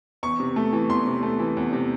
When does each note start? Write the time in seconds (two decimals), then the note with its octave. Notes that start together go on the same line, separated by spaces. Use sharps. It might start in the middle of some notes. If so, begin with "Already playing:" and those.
0.23 E2 C#6
0.40 C3
0.56 A3
0.73 E3
0.89 E2 C6
1.07 C3
1.23 A3
1.39 E3
1.57 E2
1.73 C3